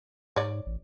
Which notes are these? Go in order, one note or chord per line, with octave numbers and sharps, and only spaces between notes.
G#2 C#5 D5
A1